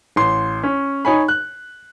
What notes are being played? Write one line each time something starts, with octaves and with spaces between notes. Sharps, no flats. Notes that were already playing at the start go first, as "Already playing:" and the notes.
A1 C6
C#4
D#4 C#5 G#5 B5
F#6